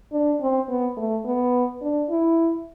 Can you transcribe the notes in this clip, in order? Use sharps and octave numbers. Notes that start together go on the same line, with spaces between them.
D4
C4
B3
A3
B3
D4
E4